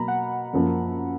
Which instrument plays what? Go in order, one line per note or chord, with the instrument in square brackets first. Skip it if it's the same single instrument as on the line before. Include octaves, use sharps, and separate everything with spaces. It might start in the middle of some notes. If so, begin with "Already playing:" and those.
Already playing: [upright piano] B2 F#3 A#3 [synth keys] A#5 B5
[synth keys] F#5
[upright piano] F#2 F3 A#3